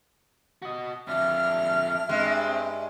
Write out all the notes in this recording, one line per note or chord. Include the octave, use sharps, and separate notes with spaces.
F#4 D#5
F2 D4 E5 F6
G2 G#3 C4